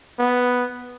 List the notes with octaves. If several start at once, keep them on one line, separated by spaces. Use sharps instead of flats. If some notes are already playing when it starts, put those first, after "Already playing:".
B3